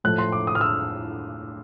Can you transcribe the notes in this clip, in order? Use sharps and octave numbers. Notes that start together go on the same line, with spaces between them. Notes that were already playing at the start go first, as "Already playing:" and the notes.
A2 F3 A3 F#6
C6
D6
D#6
F6
E6